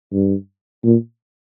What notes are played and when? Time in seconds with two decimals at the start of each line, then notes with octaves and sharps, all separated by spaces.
0.12 G2
0.84 A#2